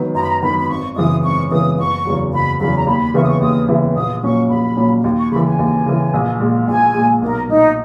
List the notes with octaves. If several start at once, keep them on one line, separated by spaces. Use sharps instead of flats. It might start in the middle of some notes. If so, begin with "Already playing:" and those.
Already playing: D#3 F#3 B3
F#2 A#5
B5
A#5
D#3 F#3 B3 B5
B5
G#1 C#6
F#2 C#3 E3 B3 D#6
G#1 C#6
F#2 C#3 E3 B3 D#6
F#1 C#6
E2 C#3 F#3
F#1 B5
E2 C#3 F#3 B5
A#5
D#2 B5
B5
C#3 E3 B3 E4 C#6
D#6
C#6
D#2 D#6
C#3 E3 B3 E4
A#1 D#6
A#2 F#3 C#4 C#6
A#1 B5
A#2 F#3 C#4
D#2
C#6
C#3 E3 B5
G#5
D#2
C#3 E3
A#1
A#2 G#3
A#1 G#5
A#2 G#3
B1 A#4
A#2 A#3 D#4